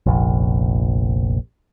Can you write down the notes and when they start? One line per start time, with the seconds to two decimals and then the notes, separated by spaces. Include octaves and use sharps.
0.06 F1 A#1